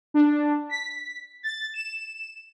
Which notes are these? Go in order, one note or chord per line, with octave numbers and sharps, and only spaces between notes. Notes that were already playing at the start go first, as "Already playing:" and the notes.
D4
B6
A6
E7